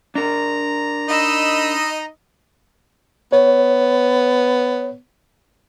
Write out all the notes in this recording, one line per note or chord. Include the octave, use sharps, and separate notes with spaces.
D4 A#4 A#5
D#4 D#5 B5 E6
B3 C#5